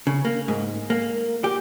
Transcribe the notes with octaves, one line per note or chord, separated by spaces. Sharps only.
C#3
A#3
G#2
A#3
G4